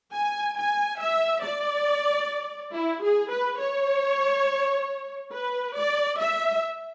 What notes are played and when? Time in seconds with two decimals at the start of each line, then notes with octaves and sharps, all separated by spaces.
0.14 G#5
0.58 G#5
1.00 E5
1.44 D5
2.75 E4
3.03 G#4
3.31 B4
3.60 C#5
5.33 B4
5.77 D5
6.20 E5